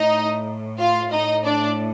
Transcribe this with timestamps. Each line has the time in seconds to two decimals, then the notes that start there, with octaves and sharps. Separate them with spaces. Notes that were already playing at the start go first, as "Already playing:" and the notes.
Already playing: A2 D#4 D#5
0.78 F4 F5
1.11 A2 D#4 D#5
1.43 D4 D5